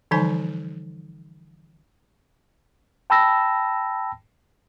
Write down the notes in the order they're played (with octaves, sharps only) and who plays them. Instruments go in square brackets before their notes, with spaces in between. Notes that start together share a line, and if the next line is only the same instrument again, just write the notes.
[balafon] D3 E3 F3 G3 D#4 G#5
[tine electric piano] G5 A5 B5 E6 A#6